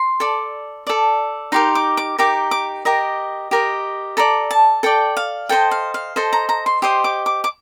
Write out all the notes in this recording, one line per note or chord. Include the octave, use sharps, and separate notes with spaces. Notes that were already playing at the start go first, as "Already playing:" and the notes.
Already playing: C6
A4 D5
A4 D5
D#4 G4 A#4 C6
D6
D6
D#4 G4 A#4 D6
D6
G4 A#4 D#5
G4 A#4 D#5
A4 D5 A#5
A5
A4 D5 G5
F5
A4 C5 D#5 G5
F5
F5
A4 C5 D#5
A#5
A#5
C6
G4 C5 D#5 C6
D6
D6
D6